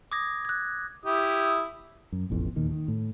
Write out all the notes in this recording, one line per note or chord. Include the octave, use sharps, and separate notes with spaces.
D6 D#6 G#6 A#6
F#6 G#6
E4 G4 D#6
F#2
E1 A1 F2 B2
D#2 A#2 D#3
D#3
A2